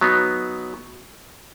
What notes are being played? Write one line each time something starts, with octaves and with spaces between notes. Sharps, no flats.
F#3 B3 D#4